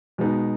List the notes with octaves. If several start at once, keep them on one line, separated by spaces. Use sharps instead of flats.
B2 G#3 B3 D#4